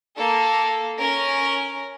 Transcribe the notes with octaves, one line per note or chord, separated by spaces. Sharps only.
A#3 A4
C#4 A#4